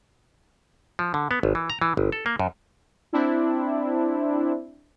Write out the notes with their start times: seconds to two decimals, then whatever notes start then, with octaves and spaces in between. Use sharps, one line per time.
0.99 F3
1.14 D3
1.31 B3
1.43 G#1
1.55 E3
1.70 A#5
1.81 E3
1.97 G1
2.12 A4
2.26 A#3
2.40 F#2
3.13 C4 D4 E4